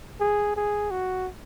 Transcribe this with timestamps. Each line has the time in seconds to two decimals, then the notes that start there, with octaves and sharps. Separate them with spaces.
0.20 G#4
0.56 G#4
0.91 F#4